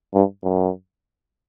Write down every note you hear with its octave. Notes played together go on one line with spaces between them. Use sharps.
G2
F#2